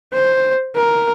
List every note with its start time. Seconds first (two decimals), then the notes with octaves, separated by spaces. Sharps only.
0.13 C5
0.76 A#4